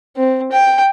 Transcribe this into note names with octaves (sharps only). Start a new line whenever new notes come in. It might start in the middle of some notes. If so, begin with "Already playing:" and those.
C4
G5